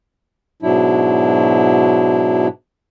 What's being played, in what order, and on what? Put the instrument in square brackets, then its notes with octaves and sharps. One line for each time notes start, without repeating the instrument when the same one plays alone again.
[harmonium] G#2 B2 F#3 D4 E4